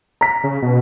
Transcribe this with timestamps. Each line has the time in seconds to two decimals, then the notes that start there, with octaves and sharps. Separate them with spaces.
0.21 A#5 B6
0.44 C#3
0.62 B2